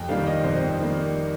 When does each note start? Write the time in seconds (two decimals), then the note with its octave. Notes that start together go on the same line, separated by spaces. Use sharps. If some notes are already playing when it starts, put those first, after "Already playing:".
Already playing: F2 G5
0.09 D#3 G3 A#3 F5
0.26 D#5
0.44 F2 C5
0.78 D#3 G3 A#3